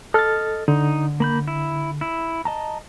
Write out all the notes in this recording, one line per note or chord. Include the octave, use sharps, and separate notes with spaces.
A4 D#5 F6 A6
D3 D#4
A#3 B5 G6
E4
E4
D#5 A5 A#5